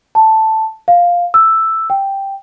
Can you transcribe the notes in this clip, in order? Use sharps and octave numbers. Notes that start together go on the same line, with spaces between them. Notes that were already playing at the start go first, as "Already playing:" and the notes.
A5
F5
E6
G5